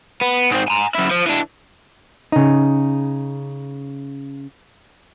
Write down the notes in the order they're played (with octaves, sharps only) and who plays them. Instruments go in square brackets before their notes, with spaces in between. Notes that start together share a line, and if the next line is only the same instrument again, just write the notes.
[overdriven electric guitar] B3
G#2 C4
G#5 A#5
F#2 E4
F3
E3 D4
[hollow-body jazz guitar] C#3 D#4